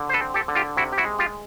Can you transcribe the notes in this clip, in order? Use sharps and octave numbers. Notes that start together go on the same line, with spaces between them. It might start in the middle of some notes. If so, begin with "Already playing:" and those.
Already playing: D3
C5
A4 B4
C4
G4 A4
D3
F4 G4
C3 E4 F#4
G4
E4 F#4
G#3
F4 G4